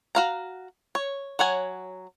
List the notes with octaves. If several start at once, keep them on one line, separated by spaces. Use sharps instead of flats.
F#4 F5 A#5
C#5
F#3 C#5 F#5 G#5